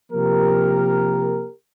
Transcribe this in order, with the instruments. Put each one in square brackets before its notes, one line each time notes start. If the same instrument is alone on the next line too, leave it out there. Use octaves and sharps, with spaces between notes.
[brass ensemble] C3 F3 A#3 G4 A#4